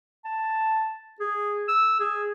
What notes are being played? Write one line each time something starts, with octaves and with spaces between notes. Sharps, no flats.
A5
G#4
E6
G#4